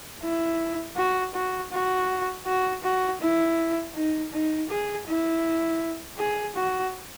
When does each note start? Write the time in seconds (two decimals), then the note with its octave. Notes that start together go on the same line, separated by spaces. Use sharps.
0.22 E4
0.97 F#4
1.34 F#4
1.72 F#4
2.46 F#4
2.83 F#4
3.21 E4
3.95 D#4
4.32 D#4
4.69 G#4
5.07 E4
6.19 G#4
6.56 F#4